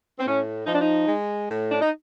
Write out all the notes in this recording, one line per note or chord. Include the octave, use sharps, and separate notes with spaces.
C4
A2 C#4
F3 D#4
D4
D#4
G#3
A2
D4
D#4